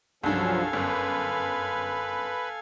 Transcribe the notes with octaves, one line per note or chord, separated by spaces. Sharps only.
C2 G2 F3 F#3 C#4 A4 F5 G#5
G1 F#2 B4